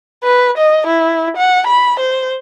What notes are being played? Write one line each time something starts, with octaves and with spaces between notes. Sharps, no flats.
B4
D#5
E4
F#5
B5
C5